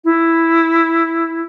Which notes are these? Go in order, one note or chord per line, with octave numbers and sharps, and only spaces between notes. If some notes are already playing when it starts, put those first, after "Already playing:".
E4